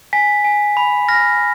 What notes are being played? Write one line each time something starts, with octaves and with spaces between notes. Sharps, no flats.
G#5 B6
G#5
B5
F6 A#6